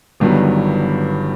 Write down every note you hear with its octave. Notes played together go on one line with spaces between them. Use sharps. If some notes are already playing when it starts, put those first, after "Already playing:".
G1 G2 D#3 F#3 B3